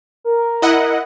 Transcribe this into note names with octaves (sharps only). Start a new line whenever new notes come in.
A#4
E4 D#5 F#5